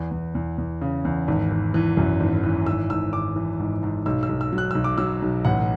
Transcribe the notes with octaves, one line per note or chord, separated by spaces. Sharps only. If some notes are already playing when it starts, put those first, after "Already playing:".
Already playing: E2
E2
E2
E2
C#3
E2
G#1
G#1
E3
F#2
G#1
E3
G#1 E6
G#1 E6
G#1 D6
E3
G#2
G#2
B1 E6
E6
B1
E6
F#3
F#6
B1 E6
D6
F#3 E6
B1
A1 F#5